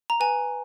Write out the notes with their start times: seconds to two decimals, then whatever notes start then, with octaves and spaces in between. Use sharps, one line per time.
0.10 A#5
0.20 B4 G#5